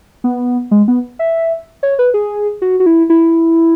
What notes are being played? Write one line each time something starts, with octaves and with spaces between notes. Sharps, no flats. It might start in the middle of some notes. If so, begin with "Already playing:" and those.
B3
G#3
B3
E5
C#5
B4
G#4
F#4
F#4
E4
E4